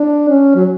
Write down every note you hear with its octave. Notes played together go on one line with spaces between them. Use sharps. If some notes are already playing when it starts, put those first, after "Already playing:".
Already playing: D4
C#4
F#3